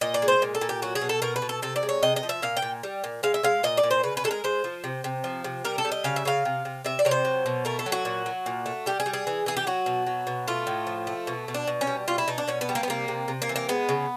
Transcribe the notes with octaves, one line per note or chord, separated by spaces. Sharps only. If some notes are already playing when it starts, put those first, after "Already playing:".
A#2 D#5
D5
G#3
C5
A#2
A4
A#2
G4
F#3 F#4
G#4
B2
A4
B2 A#4
B4
B2
A4
C3 A4
D5
G#3
C#5
C3 D#5
D#5
F3
E5
A#2 F5
G5
A#2
G3
A#2
G#3 F5
E5
G#3 F5
A#2 D#5
D5
A#2
C5
C#3 B4
B4
G#3 A4
A#4
G#3 C5
F3
C3
C3
F3
C3
G3 A#4
A4
G3
D#5
C#3 F5
E5
C#3 F5
C3
C3
C3 E5
D5
C3 C#5
C5
F#3
B2
A3 A#4
A4
F#3
F#4
A#2
F#3
A#2
A3
G3 G4
G#4
G3
G#4
E3
E3 G#4
G4
F#3 F#4
B2
F#3
B2
A3 F4
A2
F3
A3
B2
B2
D4
B2
C#4
G3
B2 F4
E4
B2 D#4
D4
B2 C#4
B3
G3
A#3
B3
C3 A#3
C3
C3
A#3
E3
A#3
G#3 B3
C#3